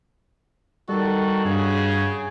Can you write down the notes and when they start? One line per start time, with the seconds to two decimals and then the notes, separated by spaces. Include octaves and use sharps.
0.89 D#3 G3 F#4 A4
1.45 G2 C#3 G#4